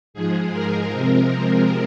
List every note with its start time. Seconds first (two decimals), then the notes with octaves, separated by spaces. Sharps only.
0.14 G#2 F3 G#3 G#4
0.52 A#4
0.90 C3 F3 G#3 C4 A#4